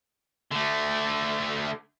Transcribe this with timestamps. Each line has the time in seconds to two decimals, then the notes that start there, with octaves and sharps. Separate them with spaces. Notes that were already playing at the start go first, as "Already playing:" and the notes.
0.51 D3 A3